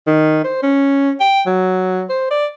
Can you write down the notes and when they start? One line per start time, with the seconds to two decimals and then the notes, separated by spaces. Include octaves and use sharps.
0.07 D#3
0.44 C5
0.63 C#4
1.20 G5
1.47 F#3
2.10 C5
2.31 D5